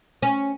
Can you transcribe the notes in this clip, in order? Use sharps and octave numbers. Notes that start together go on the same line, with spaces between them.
C#4